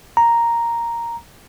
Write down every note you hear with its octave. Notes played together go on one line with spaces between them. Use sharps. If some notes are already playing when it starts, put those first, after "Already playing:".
A#5